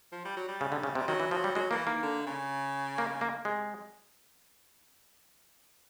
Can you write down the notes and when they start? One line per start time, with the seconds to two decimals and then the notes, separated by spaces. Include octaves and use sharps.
0.12 F3
0.25 G3
0.37 F#3
0.49 G3
0.61 C#3
0.72 D3
0.83 C#3
0.95 C3
1.00 G3
1.08 D#3 F#3
1.20 E3
1.31 F3 F#3
1.44 G3
1.55 F#3 G#3
1.71 E3 A#3
1.87 D#3 A#3
2.03 D3
2.27 C#3
2.98 A#3
3.21 A#3
3.45 C3 G#3